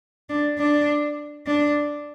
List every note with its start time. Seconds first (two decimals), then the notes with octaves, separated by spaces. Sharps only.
0.29 D4
0.59 D4
1.47 D4